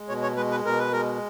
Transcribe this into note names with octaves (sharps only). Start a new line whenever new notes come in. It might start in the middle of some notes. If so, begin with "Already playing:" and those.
Already playing: G#3
B2 C#5
C#5
G#3 B4
B4
B2 A#4
B4
G#3 A#4